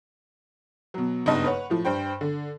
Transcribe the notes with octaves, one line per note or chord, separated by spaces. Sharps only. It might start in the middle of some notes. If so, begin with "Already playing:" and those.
B2 F#3
F#1 G2 B3 D#4 D#5 A5
B4 C#5 F#5
A2 F3
G2 C5 G5
D3